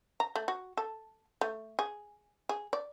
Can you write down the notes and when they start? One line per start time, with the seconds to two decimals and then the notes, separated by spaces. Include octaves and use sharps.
0.20 A#5
0.36 A3
0.48 F#4
0.77 A4
1.41 A3
1.79 G#4
2.49 G#4
2.73 D5